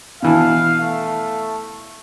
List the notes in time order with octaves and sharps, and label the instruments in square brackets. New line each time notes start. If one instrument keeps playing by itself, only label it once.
[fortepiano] B2 E3 A5 [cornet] F5
[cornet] A3